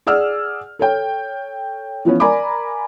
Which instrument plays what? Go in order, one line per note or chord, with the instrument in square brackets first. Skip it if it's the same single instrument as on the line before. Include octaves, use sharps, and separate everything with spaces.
[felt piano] G#4 D5 F#5 E6 F6
A4 C#5 G5
E3 F3 B3 C#4
A#4 D5 G#5 A#5 B5 D6